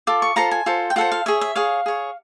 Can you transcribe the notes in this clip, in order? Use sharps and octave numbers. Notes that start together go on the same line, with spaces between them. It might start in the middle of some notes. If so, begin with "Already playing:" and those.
F4 A4 D6
C#6
F4 A4 C5 A#5
G#5
F4 A4 C5
G5
F4 A4 C5 F#5
F5
G#4 C#5 E5
E5
G#4 C#5 F5
G#4 C#5